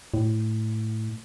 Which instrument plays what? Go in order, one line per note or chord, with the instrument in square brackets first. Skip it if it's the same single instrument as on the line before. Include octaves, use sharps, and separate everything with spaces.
[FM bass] A2